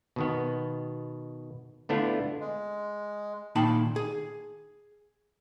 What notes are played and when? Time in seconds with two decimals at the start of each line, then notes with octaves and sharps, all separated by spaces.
0.16 B2 D#3 B3
1.89 D3 A3 B3 D4 E4 F4
2.40 G#3
3.56 A#2 D#3 D#4 G5 A5 B5
3.96 G#4